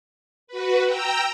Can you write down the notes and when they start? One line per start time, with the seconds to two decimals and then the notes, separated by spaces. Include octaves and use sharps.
0.47 F#4 B4
0.84 G5 A#5 E6